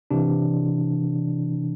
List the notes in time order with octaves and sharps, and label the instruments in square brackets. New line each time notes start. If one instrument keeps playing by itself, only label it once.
[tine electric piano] C3 E3 D4